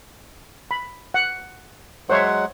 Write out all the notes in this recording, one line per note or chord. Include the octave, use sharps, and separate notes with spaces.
B5
F#5
F#3 G#3 C5 C#5 E5 F#5